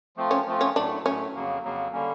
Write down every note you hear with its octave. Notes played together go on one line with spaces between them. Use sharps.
F3 A3 C4 F4
C#4
F3 A3 C4 F4
C#4
A2 F#3 A3 D4
A2 F#3 A3 C#4
F2 C#3 F#3 A#3
F2 C#3 F#3 A#3
D3 G3 A#3 C#4